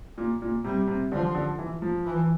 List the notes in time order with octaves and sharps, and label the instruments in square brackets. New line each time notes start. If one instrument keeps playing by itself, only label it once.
[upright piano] A#2
A#2
[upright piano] C3 [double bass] G3
[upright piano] C3
[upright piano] D3 [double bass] F3
[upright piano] D3
E3
F3
[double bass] E3